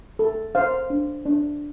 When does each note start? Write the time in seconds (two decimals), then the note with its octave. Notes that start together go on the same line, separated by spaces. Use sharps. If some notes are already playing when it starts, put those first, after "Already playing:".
0.19 A4
0.55 C5 F5
0.90 D4
1.26 D4